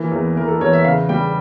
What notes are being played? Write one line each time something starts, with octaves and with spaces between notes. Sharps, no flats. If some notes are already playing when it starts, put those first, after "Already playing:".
Already playing: E3 A#3
E2
E3 A#4
A4
E2 C#5
E5
C#3 F5
G3 G5